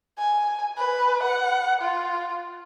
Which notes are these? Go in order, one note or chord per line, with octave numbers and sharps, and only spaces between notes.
G#5
B4
F#5
F4